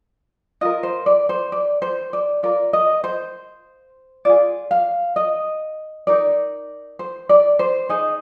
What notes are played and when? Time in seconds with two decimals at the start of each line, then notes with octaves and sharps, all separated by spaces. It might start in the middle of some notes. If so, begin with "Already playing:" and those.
0.61 F4 A#4 D#5
0.83 C5
1.06 D5
1.29 C5
1.52 D5
1.82 C5
2.13 D5
2.43 F4 A#4 D5
2.73 D#5
3.04 C5
4.25 F4 G#4 D5
4.71 F5
5.16 D#5
6.07 D#4 A#4 D5
6.99 C5
7.29 D5
7.59 C5
7.89 D#4 G#4 D#5